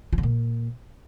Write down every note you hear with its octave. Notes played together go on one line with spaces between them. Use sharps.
F3
D3
A#2